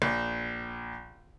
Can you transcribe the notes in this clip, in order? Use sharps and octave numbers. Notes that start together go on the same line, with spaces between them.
A#1